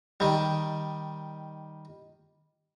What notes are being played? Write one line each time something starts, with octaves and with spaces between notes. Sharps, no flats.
D#3 G3